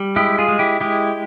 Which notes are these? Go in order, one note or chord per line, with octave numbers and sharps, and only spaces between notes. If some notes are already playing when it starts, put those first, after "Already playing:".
Already playing: G3
G#3 E4 G4
F4 G#4
G#3
E4 G4
G#3 E4 G4